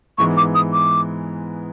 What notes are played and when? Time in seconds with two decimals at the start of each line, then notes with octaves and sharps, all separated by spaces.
0.18 G#2 E3 G#3 B3 C#6
0.37 D6
0.55 D#6
0.73 D6